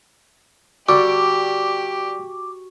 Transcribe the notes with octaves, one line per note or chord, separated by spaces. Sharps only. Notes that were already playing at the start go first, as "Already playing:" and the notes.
D3 G3 F#4 G4 A4 C#6 D6